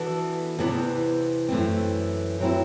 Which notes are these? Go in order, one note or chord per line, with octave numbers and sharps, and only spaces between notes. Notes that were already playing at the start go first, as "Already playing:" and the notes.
Already playing: E3 B3 D4 F#4 A4
E2 C3 E3 B3 D4
F#2 E3 A3 C4
F#2 F#3 C4 E4